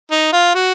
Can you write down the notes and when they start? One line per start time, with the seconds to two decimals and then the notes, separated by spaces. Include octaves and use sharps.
0.11 D#4
0.33 F4
0.55 F#4